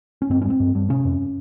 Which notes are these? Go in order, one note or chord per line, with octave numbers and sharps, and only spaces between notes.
C#4
G2 C4
C#4
G2
C4
G2
G2
C3 C#4
F2